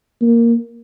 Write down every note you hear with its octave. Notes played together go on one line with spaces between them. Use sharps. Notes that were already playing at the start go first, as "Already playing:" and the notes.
A#3